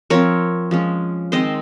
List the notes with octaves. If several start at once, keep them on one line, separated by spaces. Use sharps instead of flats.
F3 C4 A#4 C#5
F3 G#3 C#4
D#3 G#3 C4 C5 D#5